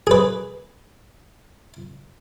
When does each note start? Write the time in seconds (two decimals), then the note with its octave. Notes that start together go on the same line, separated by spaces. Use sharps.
0.07 G#4 B4